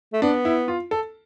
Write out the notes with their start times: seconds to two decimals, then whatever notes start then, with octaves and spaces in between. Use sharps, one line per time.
0.13 A3
0.22 B3 D4
0.45 E4
0.68 F4
0.91 A4